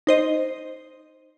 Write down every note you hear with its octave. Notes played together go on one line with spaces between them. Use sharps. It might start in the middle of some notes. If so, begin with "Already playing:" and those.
D#4 C5 D#5